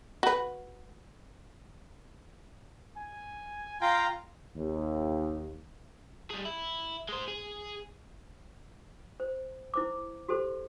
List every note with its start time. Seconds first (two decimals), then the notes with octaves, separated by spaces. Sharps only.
0.23 F#4 B4
2.97 G#5
3.82 F4 F5 G5 A#5
4.56 D#2
6.31 G3 G#4
6.45 E4
7.09 G#3 C5
7.28 G#4
9.20 C5
9.74 E4 C5 D6
10.28 F#4 G4 A4 C5